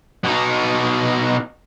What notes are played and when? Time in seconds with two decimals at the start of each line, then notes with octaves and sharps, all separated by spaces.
0.24 B2 D#4